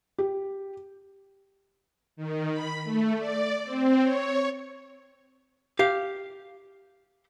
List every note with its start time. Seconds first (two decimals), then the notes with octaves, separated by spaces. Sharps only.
0.18 G4
2.17 D#3
2.51 B5
2.84 A3
3.18 D5
3.64 C4
4.02 C#5
5.79 G4 F5